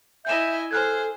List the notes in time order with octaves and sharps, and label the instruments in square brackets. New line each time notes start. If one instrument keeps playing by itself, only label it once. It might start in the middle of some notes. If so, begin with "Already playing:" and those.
[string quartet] E4 D#5 G#5 [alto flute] E5 [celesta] G6 E7
[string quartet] G#4 C5 [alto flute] A4 [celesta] F6 F#6 G#6